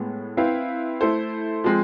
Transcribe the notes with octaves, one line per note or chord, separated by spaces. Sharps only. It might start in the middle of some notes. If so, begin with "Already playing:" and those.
Already playing: A2 G#3 B3
C4 E4 B4 F5
A3 E4 A4 C5
F3 G#3 C4